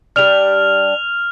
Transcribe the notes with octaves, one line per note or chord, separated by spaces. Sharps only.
G3 D4 F6 F7